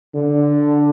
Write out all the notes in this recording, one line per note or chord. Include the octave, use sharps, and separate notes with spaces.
D3